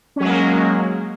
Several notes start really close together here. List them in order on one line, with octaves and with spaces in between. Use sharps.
C#4 F#3 G#3 A#3